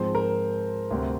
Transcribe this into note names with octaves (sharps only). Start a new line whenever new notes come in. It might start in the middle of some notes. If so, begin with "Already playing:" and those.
Already playing: G#2 F3 G#3 C4 C5
A#4
D2 C3 G3 C4